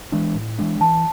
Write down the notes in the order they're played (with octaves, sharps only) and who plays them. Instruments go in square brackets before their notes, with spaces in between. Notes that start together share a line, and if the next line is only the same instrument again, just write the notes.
[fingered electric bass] E3 G#3 D4
A2
E3 G#3 D4
[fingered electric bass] E3 [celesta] A5